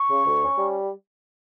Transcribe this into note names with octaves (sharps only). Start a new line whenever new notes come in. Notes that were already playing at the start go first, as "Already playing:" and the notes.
Already playing: C#6
C#3
D2
C#4
G3